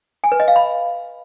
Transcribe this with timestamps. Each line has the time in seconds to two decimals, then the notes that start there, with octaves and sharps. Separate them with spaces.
0.24 G#5
0.32 B4
0.40 D#5
0.48 F5
0.56 B5